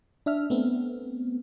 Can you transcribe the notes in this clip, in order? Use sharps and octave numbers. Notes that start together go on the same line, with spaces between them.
D4 E5 F6
A3 B3 C4